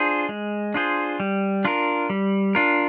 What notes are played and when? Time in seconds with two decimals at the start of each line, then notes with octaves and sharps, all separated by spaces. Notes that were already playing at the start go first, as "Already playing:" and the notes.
Already playing: D4 F4 G#4 C5
0.29 G#3
0.74 D4 F4 G#4 C5
1.20 G3
1.65 D4 F4 A#4
2.10 G3
2.55 D4 F4 A#4